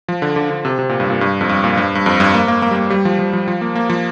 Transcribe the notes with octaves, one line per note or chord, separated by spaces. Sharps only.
F3
D3
D3
D3
C3
C3
A#2
G2
A#2
G2
F2
G2
A#2
G2
G2
F2
G2
A#3
A#3
A#3
G3
A#3
G3
F3
F3
F3
F3
A#3
A#3
F3